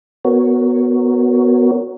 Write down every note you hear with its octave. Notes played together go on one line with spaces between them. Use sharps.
B3 F#4 A#4 C#5